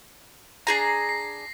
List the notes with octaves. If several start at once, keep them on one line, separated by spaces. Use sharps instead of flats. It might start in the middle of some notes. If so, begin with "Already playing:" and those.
D4 G#4 A#5 A#6 C7
C7